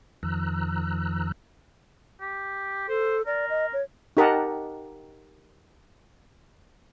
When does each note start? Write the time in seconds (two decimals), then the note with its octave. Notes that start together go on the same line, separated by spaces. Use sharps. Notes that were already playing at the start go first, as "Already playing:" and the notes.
0.23 F2 D#3 F3 A#5 E6 F#6
2.20 G4
2.88 A4 C5
3.26 A#4 D5
3.50 D#5
3.73 C#5
4.17 D#4 G4 A#4 D#5 F#5 A5